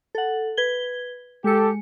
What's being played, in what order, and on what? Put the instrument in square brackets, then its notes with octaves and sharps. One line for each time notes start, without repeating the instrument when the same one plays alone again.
[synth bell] A4 F#5
B4 G#6 G7
[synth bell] G#3 C#7 [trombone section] G4 A4